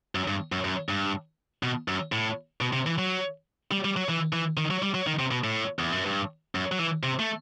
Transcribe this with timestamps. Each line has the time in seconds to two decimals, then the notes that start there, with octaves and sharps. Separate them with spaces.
0.15 F#2
0.28 G2
0.52 F#2
0.65 F#2
0.89 G2
1.63 B2
1.88 F#2
2.12 A2
2.61 B2
2.73 C3
2.86 E3
2.98 F#3
3.71 G3
3.85 G3
3.97 F#3
4.09 E3
4.33 E3
4.57 D#3
4.71 F#3
4.83 G3
4.94 F#3
5.07 D#3
5.19 C3
5.31 B2
5.44 A2
5.79 E2
5.92 F#2
6.05 G2
6.55 F#2
6.72 F#3
6.79 E3
7.03 C3
7.19 A3